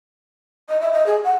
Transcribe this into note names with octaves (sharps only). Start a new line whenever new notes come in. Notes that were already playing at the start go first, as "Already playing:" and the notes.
D#5
E5
D#5
G#4
F#5